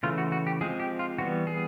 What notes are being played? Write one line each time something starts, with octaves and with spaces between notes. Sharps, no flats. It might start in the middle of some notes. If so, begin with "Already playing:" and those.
C#3 E3 A3 F4
F#4
F#4
G4
F3 G#3 C4 G#4
G4
F4
E3 G3 B3 F#4
G#4